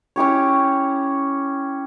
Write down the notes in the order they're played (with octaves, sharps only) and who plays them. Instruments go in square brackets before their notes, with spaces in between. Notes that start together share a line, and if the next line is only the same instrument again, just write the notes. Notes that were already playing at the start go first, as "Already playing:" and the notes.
[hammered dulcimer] C#4 E4 G4 C#5